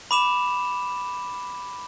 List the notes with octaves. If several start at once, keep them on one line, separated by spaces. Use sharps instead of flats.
B5 D6 E7 F7